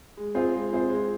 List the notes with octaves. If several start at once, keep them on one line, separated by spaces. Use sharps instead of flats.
G#3
C4 F4 G#4 C5
G#3
C4 F4 G#4 C5
G#3